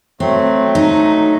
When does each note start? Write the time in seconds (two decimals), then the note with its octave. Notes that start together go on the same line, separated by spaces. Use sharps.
0.20 F#3 A3 C4
0.75 D#4